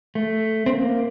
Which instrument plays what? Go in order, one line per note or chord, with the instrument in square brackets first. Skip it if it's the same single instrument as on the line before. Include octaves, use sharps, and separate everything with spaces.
[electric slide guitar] A3
C4
A#3